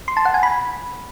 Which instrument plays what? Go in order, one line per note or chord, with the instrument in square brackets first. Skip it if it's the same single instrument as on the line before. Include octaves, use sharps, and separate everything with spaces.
[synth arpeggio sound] C6
A5
F#5
G#5
B5